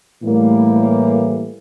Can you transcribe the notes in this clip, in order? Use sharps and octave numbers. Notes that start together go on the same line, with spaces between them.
A2 E3 G3 A#3